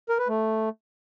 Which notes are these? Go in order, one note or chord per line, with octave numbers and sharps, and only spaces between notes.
A#4
B4
A3